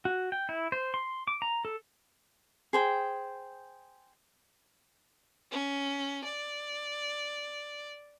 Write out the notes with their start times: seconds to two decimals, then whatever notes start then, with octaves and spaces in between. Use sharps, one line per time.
0.05 F#4
0.32 G5
0.49 E4
0.72 C5
0.94 C6
1.28 D6
1.42 A#5
1.65 A4
2.73 G#4 C5 G5
5.51 C#4
6.24 D5